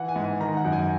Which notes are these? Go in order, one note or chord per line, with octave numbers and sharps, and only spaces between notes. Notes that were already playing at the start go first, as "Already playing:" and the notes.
Already playing: E3 F#5
G#5
G#2
G#5
D#3 A#5
F#5
F#2
G#5